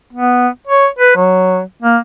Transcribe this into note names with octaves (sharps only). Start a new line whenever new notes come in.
B3
C#5
B4
F#3
A#3